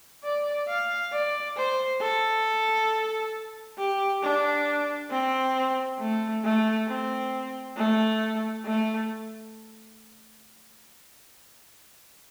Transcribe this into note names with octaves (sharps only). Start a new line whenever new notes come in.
D5
F5
D5
C5
A4
G4
D4
C4
A3
A3
C4
A3
A3